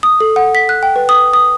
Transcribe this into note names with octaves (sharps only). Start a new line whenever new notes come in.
D#6
A4
F#5
B6
F#6
G5
B4
D#6
D#6